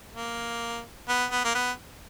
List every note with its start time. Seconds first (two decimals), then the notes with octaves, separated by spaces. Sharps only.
0.15 A#3
1.09 B3
1.31 B3
1.45 A#3
1.55 B3